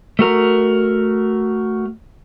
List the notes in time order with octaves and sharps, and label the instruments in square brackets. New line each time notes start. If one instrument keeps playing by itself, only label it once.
[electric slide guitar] A3 F#4 A#4